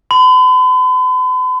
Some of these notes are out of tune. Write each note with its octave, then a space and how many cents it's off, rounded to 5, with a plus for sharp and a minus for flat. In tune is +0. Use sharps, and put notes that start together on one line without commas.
B5 +45